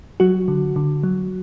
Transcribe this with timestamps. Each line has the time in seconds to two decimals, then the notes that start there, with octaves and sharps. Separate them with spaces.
0.20 F#3 F#4
0.48 D3
0.76 D3
1.03 F#3